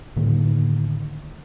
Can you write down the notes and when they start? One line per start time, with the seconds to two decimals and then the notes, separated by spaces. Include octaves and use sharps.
0.16 A2 D3 D#3 A#3